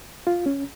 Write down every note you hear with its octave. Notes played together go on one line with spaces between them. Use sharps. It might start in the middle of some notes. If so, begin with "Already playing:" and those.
F4
C#4